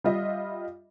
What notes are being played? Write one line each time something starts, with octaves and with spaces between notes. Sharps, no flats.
G3 F4 D#5 E5